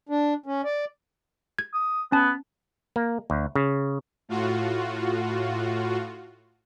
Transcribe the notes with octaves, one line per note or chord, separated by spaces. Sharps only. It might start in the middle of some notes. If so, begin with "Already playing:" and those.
D4
C#4
D5
G#6
D#6
B3 C#4 A5
A#3
D2
C#3
A2 F4 F#4